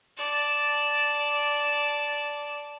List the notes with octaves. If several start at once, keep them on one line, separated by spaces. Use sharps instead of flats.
D5 A5